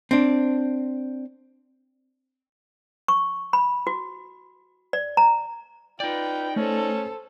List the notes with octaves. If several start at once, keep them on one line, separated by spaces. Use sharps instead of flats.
C4 D4
C#6
B5
F#4
D5
A#5
D#4 F4 B4 D5 G5
A3 C#4 A4 C5